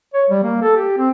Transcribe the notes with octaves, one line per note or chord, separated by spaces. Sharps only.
C#5
G3
A#3
A4
G4
C4